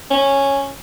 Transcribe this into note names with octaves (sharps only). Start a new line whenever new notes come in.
C#4